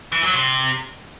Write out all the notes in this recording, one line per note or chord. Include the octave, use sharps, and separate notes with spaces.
E3
F#3
C3